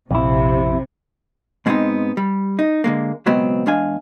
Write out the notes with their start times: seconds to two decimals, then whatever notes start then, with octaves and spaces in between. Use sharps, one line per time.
0.11 A#1 F2 C3 E4
1.66 G#2 G#3 A3 B3 C4 D#4
2.17 G3
2.59 D#4
2.84 D3 G#3 A#3
3.26 C#2 B2 F#3 G#3 B3 C4
3.66 E2 G#3 D4 F5 G#5